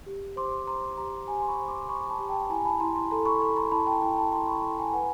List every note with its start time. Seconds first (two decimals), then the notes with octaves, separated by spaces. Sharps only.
0.06 G4
0.36 C5 C6 D6
0.67 C5 A#5 C6
0.98 G4 A#5 C6
1.28 G4 G#5 A#5
1.42 C6
1.48 B5 C#6
1.59 C5
1.68 C6 D6
1.88 C5 B5 C#6
2.09 A5 B5
2.19 G4
2.29 G5 A5
2.49 E4 G#5 A#5
2.65 A5 B5
2.80 E4 A#5 C6
2.96 A#5 C6
3.11 A4 A#5 C6
3.25 B5 C#6
3.41 A4 B5 C#6
3.56 A#5 C6
3.71 E4 A5 B5
3.87 G5 A5
4.02 E4 G5 A5
4.17 A5 B5
4.32 E4 A#5 C6
4.48 B5 C#6
4.63 A4 A#5 C6
4.78 G#5 A#5
4.93 B4 F#5 G#5